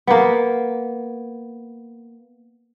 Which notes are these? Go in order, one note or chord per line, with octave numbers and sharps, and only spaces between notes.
A#3 B3